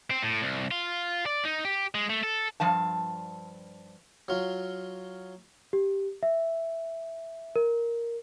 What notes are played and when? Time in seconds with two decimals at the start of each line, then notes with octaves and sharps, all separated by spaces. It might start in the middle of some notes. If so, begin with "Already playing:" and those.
0.10 C4
0.23 A2
0.43 C2
0.71 F4
1.26 D5
1.45 D#4
1.65 G4
1.95 G#3
2.10 A3
2.23 A4
2.60 G2 F3 F5 A5
4.28 F#3 F4
5.73 G4
6.23 E5
7.56 A#4